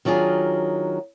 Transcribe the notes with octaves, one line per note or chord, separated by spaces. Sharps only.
D#3 F#3 D4 F4 G#4